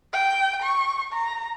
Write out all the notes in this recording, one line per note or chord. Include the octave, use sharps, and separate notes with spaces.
G5
C#6
A#5